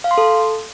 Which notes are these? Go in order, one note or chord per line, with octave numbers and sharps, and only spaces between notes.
F5
C6
A4